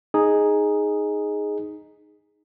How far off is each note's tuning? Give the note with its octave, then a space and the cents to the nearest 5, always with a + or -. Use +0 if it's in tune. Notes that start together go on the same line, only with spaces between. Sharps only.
D#4 -5 G#4 +0